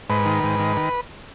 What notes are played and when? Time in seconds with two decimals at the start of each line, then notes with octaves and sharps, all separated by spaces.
0.10 G#2 B4
0.26 D#3
0.44 G#2
0.59 D#3
0.77 D#3